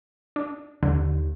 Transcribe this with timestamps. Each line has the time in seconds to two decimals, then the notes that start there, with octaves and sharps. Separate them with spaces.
0.36 D4
0.83 D#2 D3